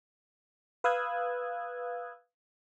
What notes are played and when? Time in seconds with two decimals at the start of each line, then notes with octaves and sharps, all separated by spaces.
0.84 B4 F5 D#6 E6 F#6 G#6